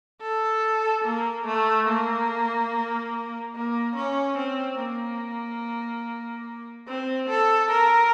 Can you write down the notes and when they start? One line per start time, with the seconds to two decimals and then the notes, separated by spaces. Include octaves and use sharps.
0.22 A4
1.05 A#3
1.47 A3
1.88 A#3
3.55 A#3
3.96 C#4
4.38 C4
4.80 A#3
6.88 C4
7.30 A4
7.71 A#4